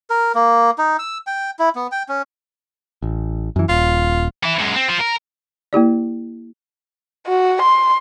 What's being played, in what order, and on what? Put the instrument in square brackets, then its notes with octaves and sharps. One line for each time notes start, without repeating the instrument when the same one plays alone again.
[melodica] A#4
A#3
D#4
E6
G5
E4
B3
G5
C#4
[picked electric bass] A1
F#2 E3
[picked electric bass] D#1 [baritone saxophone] F4
[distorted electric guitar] E3 E4
F#2 G#3
C4
F4 C5
A#4
[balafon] A#3 E4 G4 D5
[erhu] F#4
C6